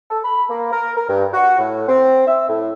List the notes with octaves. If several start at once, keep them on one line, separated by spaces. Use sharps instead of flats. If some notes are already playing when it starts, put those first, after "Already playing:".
A4
B5
A#3
A#4
A#4
G2
F#4
A2
C4
E5
A2